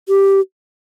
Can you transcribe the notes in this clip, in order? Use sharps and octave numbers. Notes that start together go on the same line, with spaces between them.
G4